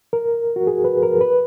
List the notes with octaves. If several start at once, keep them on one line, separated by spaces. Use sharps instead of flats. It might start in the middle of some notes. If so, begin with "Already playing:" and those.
A#4
F#4
G#4
B4
A#4
B4